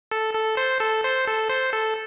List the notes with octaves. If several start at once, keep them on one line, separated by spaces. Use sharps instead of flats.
A4
A4
C5
A4
C5
A4
C5
A4